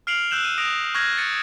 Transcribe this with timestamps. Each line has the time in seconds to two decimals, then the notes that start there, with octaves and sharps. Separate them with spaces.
0.07 F6 C7 D7 F7 F#7
0.31 E6 F#6 G6 E7 F#7
0.42 F6 D#7
0.58 D#6 A#6 D7 F7
0.95 C#6 F6 F#6 G#6 A#6 F#7
1.18 A6 C#7 D#7